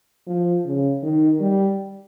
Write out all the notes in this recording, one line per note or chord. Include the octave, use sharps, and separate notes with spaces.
F3
C#3
D#3
G3